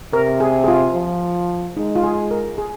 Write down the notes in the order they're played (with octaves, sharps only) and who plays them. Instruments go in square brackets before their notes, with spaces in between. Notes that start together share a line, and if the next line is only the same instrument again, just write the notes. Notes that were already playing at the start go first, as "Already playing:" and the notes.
[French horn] C3 [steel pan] A#4
[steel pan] G#4
G#4
F4
[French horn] F3
[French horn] G#3 [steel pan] D#4
[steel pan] F4
G#4
A#4
G#4